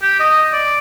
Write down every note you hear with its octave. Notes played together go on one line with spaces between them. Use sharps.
G4
D#5
D5